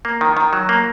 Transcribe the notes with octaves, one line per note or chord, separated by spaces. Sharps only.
A#3
D#3
D#3
F#3
A#3